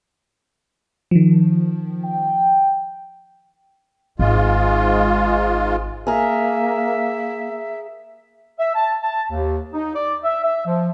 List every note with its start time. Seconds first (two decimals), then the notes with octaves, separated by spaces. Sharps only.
1.11 D#3 F3
2.05 G5
4.19 G#1 G#2 G#3 F4
6.07 A#3 G#4 A#4 E5
8.58 E5
8.75 A5
9.03 A5
9.31 D#2
9.74 D#4
9.94 D5
10.24 E5
10.44 E5
10.66 F3